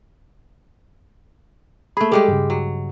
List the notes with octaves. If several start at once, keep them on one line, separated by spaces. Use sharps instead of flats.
A3 A#3 G#4 B5
G3 G#3 G4 A4
G2 C#3
F#3